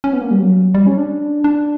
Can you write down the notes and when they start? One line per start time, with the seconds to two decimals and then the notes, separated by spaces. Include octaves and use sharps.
0.04 C#4
0.13 B3
0.21 A#3
0.31 G3
0.39 F#3
0.74 G3
0.87 C#4
0.98 D4
1.44 D4